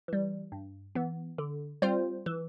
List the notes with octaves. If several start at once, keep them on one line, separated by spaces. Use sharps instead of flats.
E3 G3
G2
E3 B3
D3
G3 C4 F4 C5
E3